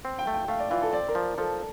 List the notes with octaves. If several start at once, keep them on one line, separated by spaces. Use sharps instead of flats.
C4
G5
A3
G5
A3 F5
D5
E3 F4
A4
C4 D5
A#4
F3
F3 A4